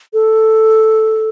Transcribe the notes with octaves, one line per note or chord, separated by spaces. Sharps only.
A4